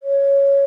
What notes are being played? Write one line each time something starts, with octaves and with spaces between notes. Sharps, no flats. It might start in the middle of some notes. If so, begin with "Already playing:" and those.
C#5